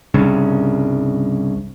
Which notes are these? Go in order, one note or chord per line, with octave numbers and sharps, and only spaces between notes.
C2 G2 C#3